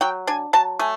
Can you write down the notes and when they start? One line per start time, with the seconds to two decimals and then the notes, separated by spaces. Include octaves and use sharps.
0.01 F#3 G5
0.27 D4 G#5
0.53 F#3 A5
0.79 A3 G#5